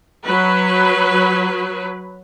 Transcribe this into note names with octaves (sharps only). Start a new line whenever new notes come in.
F#3 B4